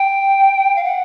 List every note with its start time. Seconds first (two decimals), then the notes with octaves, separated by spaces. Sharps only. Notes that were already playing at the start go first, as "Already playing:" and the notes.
Already playing: G5
0.76 F5
0.84 F#5